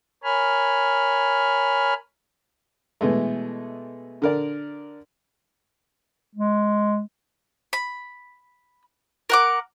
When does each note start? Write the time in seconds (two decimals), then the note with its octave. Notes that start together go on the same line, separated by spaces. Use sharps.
0.24 A#4 C#5 G#5 B5 F6
3.01 B2 E3 G#3 A3
4.22 D3 A#4 D5
6.35 G#3
7.73 B5
9.30 A#4 F#5 D6